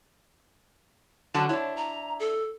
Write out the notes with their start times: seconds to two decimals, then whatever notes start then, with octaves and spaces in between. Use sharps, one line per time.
1.34 D3 F#3 C#4 A5
1.49 D4 E4 C#5
1.76 A#5
2.19 A4